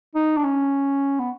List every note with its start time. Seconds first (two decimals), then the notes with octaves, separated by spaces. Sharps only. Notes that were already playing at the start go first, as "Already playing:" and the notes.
0.15 D#4
0.37 D4
0.44 C#4
1.19 B3